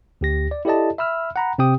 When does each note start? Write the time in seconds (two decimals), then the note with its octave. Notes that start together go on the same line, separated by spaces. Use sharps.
0.21 D2 G4 A#6
0.51 D5
0.65 E4 G4 A4 D5 D#5 A5
0.98 E5 B5 E6 F6
1.36 F#5 A#5 B5
1.58 C3 C4 G4 G5 D#6